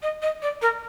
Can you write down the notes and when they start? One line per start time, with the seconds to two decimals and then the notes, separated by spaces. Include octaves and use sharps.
0.02 D#5
0.22 D#5
0.42 D5
0.61 A#4